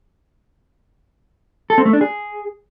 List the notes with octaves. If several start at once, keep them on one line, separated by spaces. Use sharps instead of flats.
A4
C4
A3
D4
G#4